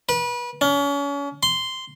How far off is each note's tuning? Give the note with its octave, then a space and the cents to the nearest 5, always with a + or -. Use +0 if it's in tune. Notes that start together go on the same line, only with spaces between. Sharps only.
B4 -30
C#4 +35
C6 -5